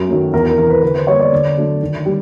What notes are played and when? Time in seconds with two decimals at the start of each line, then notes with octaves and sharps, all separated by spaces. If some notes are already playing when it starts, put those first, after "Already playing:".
Already playing: F#2
0.08 D#3 F#3 A3
0.33 E2 A#4
0.46 A#4
0.58 C3 E3 A#4
0.70 B4
0.82 D3 B4
0.95 C5
1.07 G3 A#3 C#5
1.20 D5
1.32 D3
1.56 F#3 A3 D4
1.82 D#3
2.05 G3